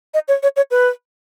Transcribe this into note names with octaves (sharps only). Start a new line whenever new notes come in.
D#5
C#5
C#5
C#5
B4